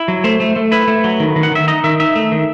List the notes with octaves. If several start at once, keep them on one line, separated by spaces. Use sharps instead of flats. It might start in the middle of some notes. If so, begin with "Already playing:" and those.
Already playing: E4
F#3
A3 C5
A3
A3
E4 B4
A3
F#3
D#3
D#3
F#5
D#3 E5
D#4 D#5
D#3 E5
D#4 E5
A3
D#3